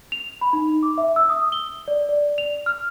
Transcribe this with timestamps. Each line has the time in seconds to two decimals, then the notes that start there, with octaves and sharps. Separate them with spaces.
0.12 F7
0.41 B5
0.53 D#4
0.83 D6
0.98 E5
1.16 E6
1.29 D#6
1.52 G7
1.88 D5
2.09 D5
2.38 F7
2.66 F6